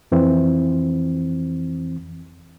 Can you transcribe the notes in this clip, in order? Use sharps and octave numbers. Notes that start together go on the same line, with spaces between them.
F2 E3 C4